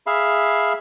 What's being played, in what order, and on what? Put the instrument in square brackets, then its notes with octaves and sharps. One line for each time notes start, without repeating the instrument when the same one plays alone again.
[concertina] G#4 E5 F5 B5